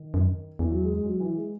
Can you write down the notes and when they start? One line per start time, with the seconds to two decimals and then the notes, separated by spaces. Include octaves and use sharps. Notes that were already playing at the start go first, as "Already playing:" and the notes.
Already playing: D#3
0.14 F#2
0.59 E2 E3
0.70 F#3
0.82 G#3
0.93 G#3
1.05 F#3
1.20 E3
1.35 G#3